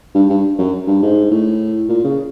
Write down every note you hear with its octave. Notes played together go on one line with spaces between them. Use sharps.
G2
G2
F#2
G2
G#2
A2
A#2
C#3